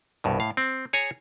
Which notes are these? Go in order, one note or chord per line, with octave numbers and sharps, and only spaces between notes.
C2 G2 B2
A2 F5
C4
G#4 C#5 G#5 A#5